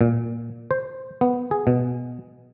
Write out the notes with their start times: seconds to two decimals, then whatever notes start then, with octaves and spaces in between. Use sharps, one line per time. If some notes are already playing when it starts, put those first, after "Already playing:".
0.01 A#2
0.71 C5
1.21 B3
1.51 G#4
1.67 B2